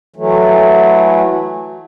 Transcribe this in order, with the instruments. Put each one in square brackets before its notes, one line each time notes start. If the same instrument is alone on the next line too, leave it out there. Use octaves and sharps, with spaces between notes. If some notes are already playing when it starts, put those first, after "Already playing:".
[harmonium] E3 F#3 A3